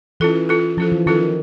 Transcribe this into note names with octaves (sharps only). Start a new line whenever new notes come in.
E3 C#4 F4 A4
C#4 F4 A4
F3 C#4 F4 A4
E3
D#3 C#4 F4 A4